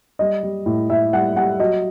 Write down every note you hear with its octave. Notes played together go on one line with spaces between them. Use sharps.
G3 D#5
G3
A2
A2 E5
G3 F#5
G3 F#5
F#3 D#5